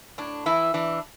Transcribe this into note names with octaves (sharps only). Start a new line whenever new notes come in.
A2 D4
E3 E4
E3 D4